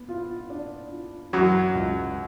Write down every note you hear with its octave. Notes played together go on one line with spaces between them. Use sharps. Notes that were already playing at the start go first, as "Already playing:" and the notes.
Already playing: B3
F4
D4
F4
F#2 E3 F#3
C#2